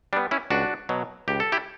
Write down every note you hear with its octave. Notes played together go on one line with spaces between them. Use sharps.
G3 B3 D4
C#4 E4
C#2 D4 F#4
B2 F#3
C#2 G4
A4
E4 G4